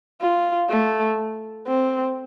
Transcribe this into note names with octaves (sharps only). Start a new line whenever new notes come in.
F4
A3
C4